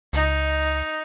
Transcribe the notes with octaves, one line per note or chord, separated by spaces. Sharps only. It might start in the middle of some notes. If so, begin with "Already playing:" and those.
C#2 D#4